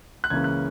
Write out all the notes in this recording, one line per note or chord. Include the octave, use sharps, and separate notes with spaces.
F#6
C#2 C#3 E3 A#3 C#4 G#6
F#6